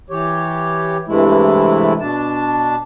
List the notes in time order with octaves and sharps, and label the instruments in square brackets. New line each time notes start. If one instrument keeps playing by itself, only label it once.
[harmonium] E3 G4 C#5
G2 C3 E3 G#3 A3 E4
B2 D4 A5